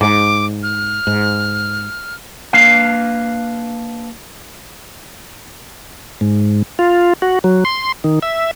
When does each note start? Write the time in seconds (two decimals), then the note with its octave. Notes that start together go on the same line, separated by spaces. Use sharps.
0.01 G#2 D6
0.63 F6
1.07 G#2
2.53 A#3 D4 B4 F5
6.21 G#2
6.79 F4
7.22 F#4
7.44 F#3
7.65 C6
8.04 D#3
8.22 E5